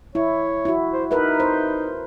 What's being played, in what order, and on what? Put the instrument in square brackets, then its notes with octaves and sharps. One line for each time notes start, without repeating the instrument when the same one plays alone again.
[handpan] E4 [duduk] C#5
[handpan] E4 F#4
[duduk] C5
[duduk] D#4 [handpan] A#4 B4 E5
[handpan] C5